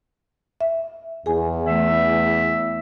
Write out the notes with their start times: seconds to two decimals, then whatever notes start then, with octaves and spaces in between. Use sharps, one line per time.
0.61 E5
1.26 E2 G#4 G#5
1.66 E3 A3 E5